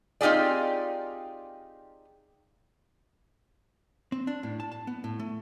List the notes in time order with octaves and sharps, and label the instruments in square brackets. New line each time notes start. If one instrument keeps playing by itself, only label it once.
[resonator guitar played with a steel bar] C4 D#4 F4 G4 G#4 D5
[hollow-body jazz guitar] C4
D4
A2
A5
A5
B3
A2
A3